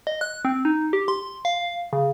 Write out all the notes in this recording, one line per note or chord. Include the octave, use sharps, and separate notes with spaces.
D#5
F#6
C4
D#4
G4
C6
F5
C#3